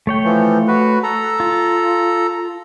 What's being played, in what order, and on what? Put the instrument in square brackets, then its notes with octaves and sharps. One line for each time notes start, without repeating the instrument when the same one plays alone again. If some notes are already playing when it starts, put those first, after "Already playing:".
[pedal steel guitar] A3 C#5 G5
[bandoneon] E3 F3
F#4 B4
A4 A#5
[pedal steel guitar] F4